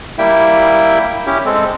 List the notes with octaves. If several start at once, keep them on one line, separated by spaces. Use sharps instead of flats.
G3 A#3 E4 E5 G5
C#4 E4 G4
G#3 C4 A4